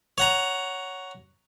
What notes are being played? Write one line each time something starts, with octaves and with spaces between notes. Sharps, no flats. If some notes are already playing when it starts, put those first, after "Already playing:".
C#5 F#5 A#5